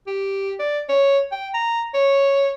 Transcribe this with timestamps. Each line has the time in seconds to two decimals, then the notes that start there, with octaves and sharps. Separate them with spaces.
0.07 G4
0.59 D5
0.89 C#5
1.32 G5
1.54 A#5
1.94 C#5